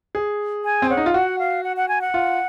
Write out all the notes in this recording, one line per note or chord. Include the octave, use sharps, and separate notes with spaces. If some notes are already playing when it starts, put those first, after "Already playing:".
G#4
G#5
C4
C#4 F#5
D#4
F4
F#4 F#5
F5
F#5
F#5
G#5
F#5
F4